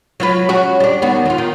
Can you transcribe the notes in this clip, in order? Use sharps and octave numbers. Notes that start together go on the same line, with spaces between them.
F#3 F4 B4
C#4 F#4
G3 D4
D#2 B3 F#4
D#2 F4
D#3